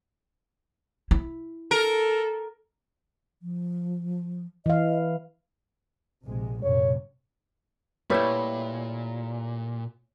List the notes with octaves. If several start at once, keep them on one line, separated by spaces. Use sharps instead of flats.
E4
A4 A#4
F3
E3 D#5 F5
A#1 C3 G#3
A#1 F#2 C3 C#5
A#2 G3 A3 E4 B4 C#5